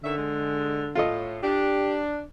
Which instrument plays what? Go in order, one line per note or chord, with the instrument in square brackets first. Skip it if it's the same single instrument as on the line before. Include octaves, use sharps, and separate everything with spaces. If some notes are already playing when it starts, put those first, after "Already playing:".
[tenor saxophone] D3 [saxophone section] D#3 C#4 E5
[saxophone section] G#3
[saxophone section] A2 [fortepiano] F4 A4 D#5
[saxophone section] D4 [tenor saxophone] G4